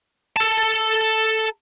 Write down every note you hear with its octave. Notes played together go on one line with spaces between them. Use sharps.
A4 A5